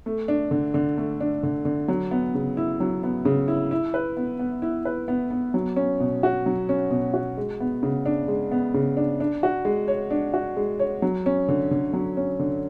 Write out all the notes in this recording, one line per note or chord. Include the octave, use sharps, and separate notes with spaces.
A3
D4
D3
D3
A3
D4
D3
D3
F#3
B3
C#3
E4
F#3
B3
C#3
E4
E4
B4
B3
B3
E4
B4
B3
B3
F#3
C#4
B2
F#4
F#3
C#4
B2
F#4
G#3
B3
C#3
D4
G#3
B3
C#3
D4
D4
F#4
G#3
C#5
D4
F#4
G#3
C#5
F#3
C#4
D3
D3
F#3
C#4
D3